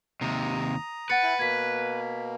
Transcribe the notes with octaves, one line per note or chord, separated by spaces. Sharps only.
D#2 C3 A#5 D#6
B4 F#5 A6 C#7
E4 G#5 F#6
B2 A#3 G#6 B6